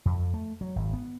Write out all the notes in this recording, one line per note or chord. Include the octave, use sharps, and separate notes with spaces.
F2
A3
F#3
G#1
B3